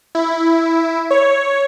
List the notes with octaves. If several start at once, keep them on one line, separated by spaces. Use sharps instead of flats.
E4
C#5